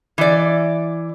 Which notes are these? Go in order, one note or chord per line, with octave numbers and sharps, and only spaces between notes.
E3 D5